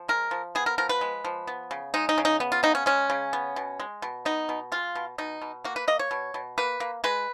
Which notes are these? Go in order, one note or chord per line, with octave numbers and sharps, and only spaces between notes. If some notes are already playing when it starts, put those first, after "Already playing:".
Already playing: F3
G#3 A#4
F3
B3 G#4
A#4
F3 A#4
B4
G#3
F3
B3
C#3
G#3 D#4
D#4
C#3
D#4
B3
F4
C#3 D#4
C#4
G#3 C#4
C#3
B3
B2
G#3
B2
B3 D#4
B2
G#3 F4
B2
B2 D#4
B2
A#3 F#4
B4
A#3 D#5
C#5
B2
B2
A#3 B4
A#3
G#3 B4